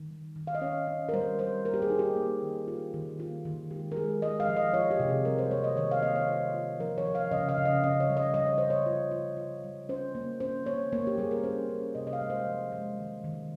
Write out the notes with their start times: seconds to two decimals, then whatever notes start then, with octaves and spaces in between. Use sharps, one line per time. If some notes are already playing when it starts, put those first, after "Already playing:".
Already playing: D#3
0.10 G3
0.36 D#3
0.47 F5
0.55 D#5
0.61 C#4 C#5
0.87 C#4
1.09 A#4
1.13 G3 C5
1.39 G3 C5
1.65 A#3 A#4
1.74 G4
1.82 G#4
1.90 D#4
1.99 G4
2.16 A#3
2.42 D#3
2.68 F4
2.94 D#3
3.19 A#3 F4
3.45 D#3
3.70 G#3 G4
3.92 A#4
3.96 G#3 G#4
4.22 G#3 D#5
4.40 F5
4.48 F3
4.57 D#5
4.74 F4 C#5
4.91 G4
4.99 C3
5.09 G#4
5.25 G3 A#4
5.38 C5
5.51 A#3 C#5
5.64 D#5
5.76 D#3 C#5
5.91 F5
6.02 A#3 D#5
6.16 C#5
6.28 F4 C5
6.54 F4
6.80 F3 A#4
6.98 C#5
7.06 F3
7.15 F5
7.31 C#3 D#5
7.49 F5
7.57 C#3
7.65 D#5
7.83 C#3 D#5
8.00 C#5
8.09 G3
8.17 D#5
8.34 G3 D#5
8.46 C#5
8.58 C#3 C5
8.70 C#5
8.86 F4
9.11 F4
9.37 F4
9.64 G3
9.89 C#4 C5
10.15 A#3
10.40 C#4 C5
10.66 A#3 C#5
10.92 A#3 C#5
11.07 G4
11.18 G3 G#4
11.31 A#4
11.44 C#4 C5
11.69 C#4
11.95 C3 D#5
12.07 D#5
12.13 F5
12.21 G#3
12.30 C5
12.47 F3
12.72 G#3
12.98 D#3
13.24 D#3